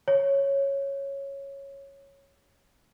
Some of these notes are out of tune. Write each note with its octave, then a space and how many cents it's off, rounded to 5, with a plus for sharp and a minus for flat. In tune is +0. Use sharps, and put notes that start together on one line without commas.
C#5 -5